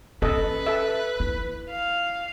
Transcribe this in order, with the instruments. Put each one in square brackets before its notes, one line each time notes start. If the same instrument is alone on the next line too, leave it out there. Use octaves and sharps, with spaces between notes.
[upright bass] C#4 [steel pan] A4 D#5 [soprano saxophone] B4
[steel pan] A4 E5
[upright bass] E4
[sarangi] F5